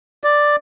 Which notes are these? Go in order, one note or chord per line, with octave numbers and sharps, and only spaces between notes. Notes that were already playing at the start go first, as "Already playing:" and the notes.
D5